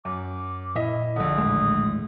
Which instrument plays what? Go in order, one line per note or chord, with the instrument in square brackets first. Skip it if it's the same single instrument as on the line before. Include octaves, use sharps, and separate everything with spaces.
[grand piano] F#2 [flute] D6
[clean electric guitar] A#2 E5 [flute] E4 [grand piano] D#5
[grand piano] A#1 D3 [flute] D#6
[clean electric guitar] D#2 A2 G#3